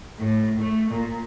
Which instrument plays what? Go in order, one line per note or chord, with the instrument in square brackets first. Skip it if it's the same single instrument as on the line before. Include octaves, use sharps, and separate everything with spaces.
[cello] A2
A3
A#2